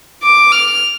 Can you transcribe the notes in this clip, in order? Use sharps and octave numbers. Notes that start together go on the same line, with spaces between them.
D6
F6